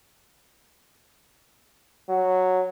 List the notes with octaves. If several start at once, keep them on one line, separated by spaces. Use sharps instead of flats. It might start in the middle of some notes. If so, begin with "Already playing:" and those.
F#3